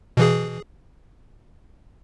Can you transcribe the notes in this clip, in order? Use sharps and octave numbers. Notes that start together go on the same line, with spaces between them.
B2 E3 G#4